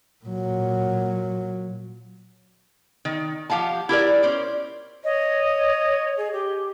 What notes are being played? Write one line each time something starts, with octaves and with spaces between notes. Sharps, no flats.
A#2 F#3
D#3
F3 G4 F5 F#5 A5
E4 G4 A#4 D5
C#4 C5 D5
C#5 D#5
G#4
G4